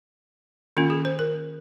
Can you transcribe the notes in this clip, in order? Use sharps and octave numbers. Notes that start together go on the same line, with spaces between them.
D#3 A#3 C#4 F4
G#4
C5
A#4